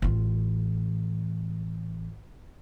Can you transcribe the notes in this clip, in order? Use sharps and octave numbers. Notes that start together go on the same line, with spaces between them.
A1 F4